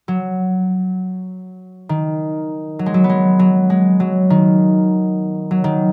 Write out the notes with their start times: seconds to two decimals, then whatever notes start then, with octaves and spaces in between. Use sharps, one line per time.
0.08 F#3
1.89 D#3
2.79 F#3
2.86 G#3
2.94 F#3
3.04 B3
3.09 G#3
3.39 F#3
3.70 G#3
4.00 F#3
4.30 D#3
5.51 F#3
5.64 D#3